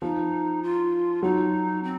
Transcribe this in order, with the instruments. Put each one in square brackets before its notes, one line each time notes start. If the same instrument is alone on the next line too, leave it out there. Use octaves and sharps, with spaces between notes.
[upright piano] F3 [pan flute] D#4
[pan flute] F4
[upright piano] F#3 [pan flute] D#4
[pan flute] C4